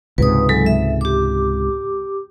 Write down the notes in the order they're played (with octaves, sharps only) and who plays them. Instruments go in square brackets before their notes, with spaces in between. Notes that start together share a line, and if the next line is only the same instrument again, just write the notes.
[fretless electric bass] C#2 G#2 C3 [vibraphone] B4 D#6
[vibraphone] F#3 G#3 A4
E5
G4 D6